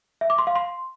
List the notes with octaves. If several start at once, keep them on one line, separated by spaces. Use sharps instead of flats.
E5
D6
C6
F5
C6